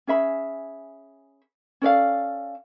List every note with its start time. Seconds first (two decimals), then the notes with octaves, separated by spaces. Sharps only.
0.07 C#4 G#4 E5 B5
1.82 C#4 A4 D5 F5